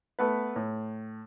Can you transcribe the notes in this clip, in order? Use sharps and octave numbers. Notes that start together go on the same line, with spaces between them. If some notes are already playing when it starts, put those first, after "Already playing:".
A3 B3 B4
A2